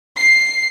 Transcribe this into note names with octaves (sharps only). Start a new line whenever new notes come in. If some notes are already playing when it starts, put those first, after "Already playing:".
C7